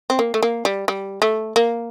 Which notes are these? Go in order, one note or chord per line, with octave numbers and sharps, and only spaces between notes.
C4
A#3
A3
A#3
G3
G3
A3
A#3